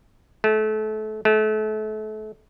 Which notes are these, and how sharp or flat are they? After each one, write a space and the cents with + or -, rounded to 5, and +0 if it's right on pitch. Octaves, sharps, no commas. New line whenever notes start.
A3 -30
A3 -35